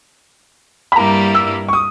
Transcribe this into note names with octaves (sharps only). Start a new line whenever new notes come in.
B5
G2 G3 A#3 E4 A#5
E6
C#6
D#6